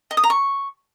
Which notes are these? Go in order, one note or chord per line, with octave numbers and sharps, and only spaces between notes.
D#5
D#6
A#5
C#6